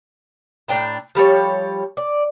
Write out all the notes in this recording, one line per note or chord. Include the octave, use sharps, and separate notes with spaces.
A2 D4 G5 A#5
F3 G3 A4 C#5
D5